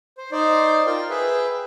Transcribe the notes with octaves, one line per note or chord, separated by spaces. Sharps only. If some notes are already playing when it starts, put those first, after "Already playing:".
C5
D#4 C5 D5
F4 A#4 G5
G#4 B4 E5 G5